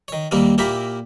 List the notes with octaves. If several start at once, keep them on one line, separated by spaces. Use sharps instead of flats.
D#3 C#5
D#2 C3 G3 A#3 C4
A#2 A#3 E4 G4 A#4 E5